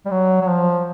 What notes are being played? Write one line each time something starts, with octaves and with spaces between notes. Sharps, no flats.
G3
F#3
F#3
F3